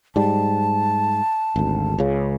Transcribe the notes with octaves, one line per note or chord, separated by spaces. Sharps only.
G#2 G3 A5
G#1 D2
C#2 C#3